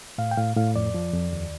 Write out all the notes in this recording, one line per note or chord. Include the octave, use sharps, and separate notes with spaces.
A2 F5
G5
A2 F5
A2 F5
F2 D5
F3
F2
D#2